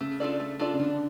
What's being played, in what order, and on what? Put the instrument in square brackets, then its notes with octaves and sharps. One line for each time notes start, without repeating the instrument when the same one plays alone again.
[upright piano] C#3 [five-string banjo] A3
[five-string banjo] D4 F4 A4 D5
A3
D4 F4 A4 D5
[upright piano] C#3
[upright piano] D3 [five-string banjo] D4